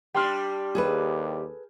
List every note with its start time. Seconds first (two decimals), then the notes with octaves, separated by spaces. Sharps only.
0.14 G3 D4 G4 C6 F6
0.75 D#2 G#4 A4 B4